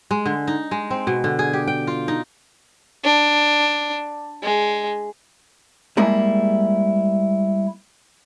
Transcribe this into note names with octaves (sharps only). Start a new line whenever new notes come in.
G#3
D3
D#4
G#3
C4
B2
D3
G#4
G4
G5
F4
D#4
D4
G#3
G3 G#3 A#3 E4 G#4